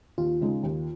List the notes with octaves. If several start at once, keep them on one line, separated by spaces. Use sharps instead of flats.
D#2 F4
C#3 G#3 D#4
D#2